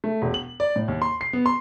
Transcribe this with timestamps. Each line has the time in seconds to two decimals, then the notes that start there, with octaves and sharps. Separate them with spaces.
0.04 A3
0.22 E1
0.34 F#7
0.60 D5
0.76 A2
0.88 D#2
1.02 C6
1.21 C7
1.33 B3
1.46 C6